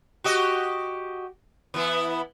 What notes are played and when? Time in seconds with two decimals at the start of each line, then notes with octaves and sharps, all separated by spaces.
0.24 F#4 G4 D#5
1.74 E3 B3 E4